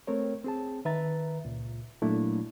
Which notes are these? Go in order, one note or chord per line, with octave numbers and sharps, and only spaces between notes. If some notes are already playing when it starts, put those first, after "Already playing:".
A3 C4 A#4 C#5
C4 G#4 A5
D#3 B4 E5 A#5 A6
C#2 A#2
A#2 F#3 A3 A#3 D4 E4